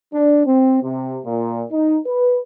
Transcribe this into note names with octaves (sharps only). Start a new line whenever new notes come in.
D4
C4
C3
A#2
D#4
B4